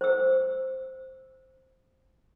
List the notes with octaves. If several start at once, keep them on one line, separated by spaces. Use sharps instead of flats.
C5 E6